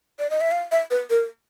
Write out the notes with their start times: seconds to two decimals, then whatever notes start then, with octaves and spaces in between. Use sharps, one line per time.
0.19 D5
0.30 D#5
0.41 E5
0.51 F5
0.72 E5
0.91 B4
1.10 A#4